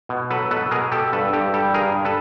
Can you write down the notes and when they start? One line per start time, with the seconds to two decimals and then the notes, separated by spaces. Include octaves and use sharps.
0.09 B2
0.30 F#3 A4 B4
0.51 B2 A4 B4
0.71 B2 G#4 A#4
0.92 B2 G4 A4
1.13 G2 A4 B4
1.33 G2 G4 A4
1.54 G3 G4 A4
1.74 G2 G#4 A#4
1.94 G2
2.05 A4 B4